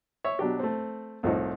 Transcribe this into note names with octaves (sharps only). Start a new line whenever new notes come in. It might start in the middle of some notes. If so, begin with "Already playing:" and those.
C#5 E5
B2 F#3 D4 G4
A3 C4
C2 A2 F3 C4 D#4